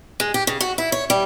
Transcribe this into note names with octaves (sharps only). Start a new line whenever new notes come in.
G#3
G4
C#3
F#4
E4
C#5
G3